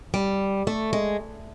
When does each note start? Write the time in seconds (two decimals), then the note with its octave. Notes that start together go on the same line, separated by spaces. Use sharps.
0.14 G3
0.67 A3
0.93 G#3